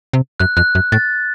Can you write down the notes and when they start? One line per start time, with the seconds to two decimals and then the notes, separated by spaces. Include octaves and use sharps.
0.13 C3
0.40 F#2 F#6
0.57 F2 F#6
0.75 F#2
0.92 A2 A6